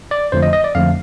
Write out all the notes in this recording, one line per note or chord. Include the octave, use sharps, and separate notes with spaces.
D5
F2 D3 F3 A3 C5
D#5
D#5
D5
F2 D3 F3 A3 F5